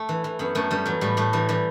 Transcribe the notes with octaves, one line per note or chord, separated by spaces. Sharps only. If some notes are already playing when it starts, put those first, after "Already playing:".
Already playing: A3
E3
E3
F#2 B3
F#2 A3
F#2 G3
E3 F#3
A2 G3
A2 A3
E3 G3
E3 G3